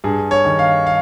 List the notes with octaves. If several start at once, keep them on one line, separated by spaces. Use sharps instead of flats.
G2 G#4
C#5
D#3
F5
F5